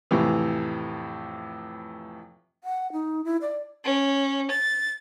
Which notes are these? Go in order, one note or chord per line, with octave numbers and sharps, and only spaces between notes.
F2 A2 C3 E3
F#5
D#4
E4
D5
C#4
A6